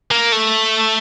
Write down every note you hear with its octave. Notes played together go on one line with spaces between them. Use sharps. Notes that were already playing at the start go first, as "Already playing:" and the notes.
A#3
A3